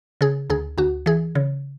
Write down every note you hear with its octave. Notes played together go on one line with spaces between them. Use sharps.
C#3 G#4
D2 G#4
D2 F#4
E3 G#4
C#3